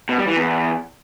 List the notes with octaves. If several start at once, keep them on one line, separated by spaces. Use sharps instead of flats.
B2
G3
E3
E2